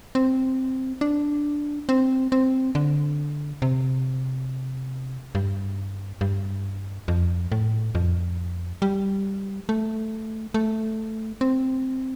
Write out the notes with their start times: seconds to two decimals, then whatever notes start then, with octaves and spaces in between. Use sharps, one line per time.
0.15 C4
1.01 D4
1.89 C4
2.32 C4
2.75 D3
3.62 C3
5.35 G2
6.21 G2
7.08 F2
7.52 A2
7.95 F2
8.82 G3
9.69 A3
10.54 A3
11.41 C4